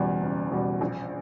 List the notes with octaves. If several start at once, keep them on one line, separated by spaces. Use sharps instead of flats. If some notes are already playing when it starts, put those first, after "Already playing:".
Already playing: F#1 E2 B2 G3
F#1
E2 B2 G3
A#1